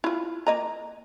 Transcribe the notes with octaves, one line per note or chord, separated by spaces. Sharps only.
E4 F4
A#3 D#5 A#5